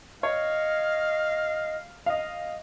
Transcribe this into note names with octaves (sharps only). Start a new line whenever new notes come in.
C#5 D#5 F5
D#5 F5